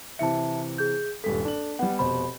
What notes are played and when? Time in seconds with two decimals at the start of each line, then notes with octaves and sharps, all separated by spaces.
0.19 C3 E3 E5 A5 C#7
0.78 G#4 G6
1.24 D#1 G2 A4 B6
1.45 D4 F#7
1.79 G3 B3 F#5
1.99 F1 B2 C5 B5